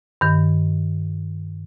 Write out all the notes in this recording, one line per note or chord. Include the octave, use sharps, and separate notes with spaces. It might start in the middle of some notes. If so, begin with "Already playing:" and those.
G2 D#3